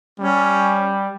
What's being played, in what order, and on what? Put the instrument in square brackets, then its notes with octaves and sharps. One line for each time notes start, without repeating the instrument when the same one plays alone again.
[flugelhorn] G3 [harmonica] C#4